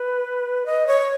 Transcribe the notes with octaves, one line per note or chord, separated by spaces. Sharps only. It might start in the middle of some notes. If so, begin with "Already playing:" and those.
Already playing: B4
D#5
C#5